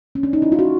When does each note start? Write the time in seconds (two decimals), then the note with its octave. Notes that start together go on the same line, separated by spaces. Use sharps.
0.15 C#4
0.23 D4
0.33 D#4
0.42 E4
0.52 F4
0.59 F#4